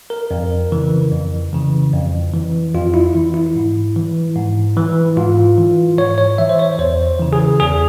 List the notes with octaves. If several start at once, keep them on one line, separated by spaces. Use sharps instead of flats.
A#4
F2
C#3 E3
F2
C#3 E3
F2
E3
F2 F4
E4
E3
E4
G#2
E3
G#2
E3
G#2 F4
E3
G#2 C#5
C#5
E3 E5
C5
C#5
E2 C5
C#3 E3
G#4
E2 G#4